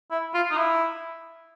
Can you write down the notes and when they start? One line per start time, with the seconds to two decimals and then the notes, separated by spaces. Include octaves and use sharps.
0.11 E4
0.34 F4
0.51 D#4
0.57 E4